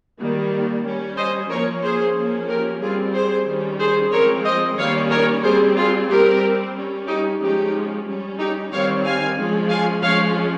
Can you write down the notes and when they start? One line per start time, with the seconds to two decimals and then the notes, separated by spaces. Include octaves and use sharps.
0.19 D#3 G3 A#3
0.84 G3 C#4
1.17 C5 D#5
1.50 F3 A#3 C#4 A#4 C#5
1.83 G#4 C5
2.16 F3 A#3 C#4
2.48 G4 A#4
2.81 G3 C4 F4 G#4
3.14 G#4 C5
3.46 D#3 G3 C#4
3.79 G#4 C5
4.12 F3 G#3 C4 A#4 C#5
4.45 C5 D#5
4.78 D#3 G3 A#3 C#4 C#5 F5
5.11 A#4 C#5
5.43 G3 C4 G#4 C5
5.76 F4 G#4
6.09 G3 C4 G4 A#4
6.74 G3 C#4
7.07 D#4 G4
7.40 F3 G#3 C#4 D#4 G4
8.06 G3 C#4
8.39 D#4 G4
8.72 D#3 G3 C4 C#5 F5
9.04 F5 G#5
9.37 F3 G#3 C#4
9.69 F5 G#5
10.02 F3 G#3 C#4 C#5 F5